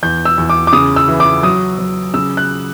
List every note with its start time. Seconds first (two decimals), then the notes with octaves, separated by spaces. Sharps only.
0.03 E2 G6
0.25 E6
0.38 E2
0.50 D6
0.67 D6
0.73 C#3 D#6
0.96 E6
1.08 E3
1.20 D6
1.43 F#3 D#6
1.78 F#3
2.14 C#3 E6
2.37 F#6